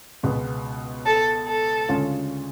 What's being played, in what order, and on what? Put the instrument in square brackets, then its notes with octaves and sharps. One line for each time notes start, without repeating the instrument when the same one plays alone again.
[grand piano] C#2 B2 G#3 B3
[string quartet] A4
A4
[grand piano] D2 C#3 G#3 C#4 F4